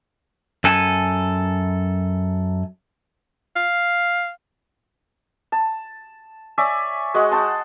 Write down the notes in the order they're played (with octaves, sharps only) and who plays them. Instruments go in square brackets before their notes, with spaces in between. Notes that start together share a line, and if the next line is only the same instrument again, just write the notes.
[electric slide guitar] F#2 A4 G#5
[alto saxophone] F5
[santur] A5
C#5 D5 E5 G#5
G#3 F#4 D#5 F#5
F#5 G5 A5 C6